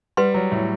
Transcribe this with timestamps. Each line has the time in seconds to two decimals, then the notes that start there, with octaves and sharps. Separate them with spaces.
0.17 G3 B4 F#5 C6
0.34 F#3
0.52 A2